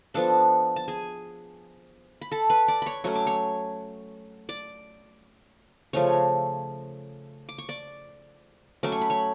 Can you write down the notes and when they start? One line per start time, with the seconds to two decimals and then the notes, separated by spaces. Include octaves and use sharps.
0.14 F3 B3 D4 A4 A5
0.76 A5
0.88 G#4 G#5
2.21 B5
2.31 A4 A5
2.50 B4 B5
2.68 D5 D6
2.82 C#5 B5 C#6
3.04 F#3 A3 C#4 C#6
3.15 D6
3.26 C#5 C#6
4.49 D5 D6
5.93 C#3 F3 A3 C#4 C#5 C#6
7.49 D6
7.58 C#6
7.69 D5 D6
8.83 F#3 A3 C#4 D6
8.92 C#6
9.01 B5
9.10 C#5 C#6